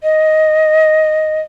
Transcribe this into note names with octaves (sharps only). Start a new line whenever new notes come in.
D#5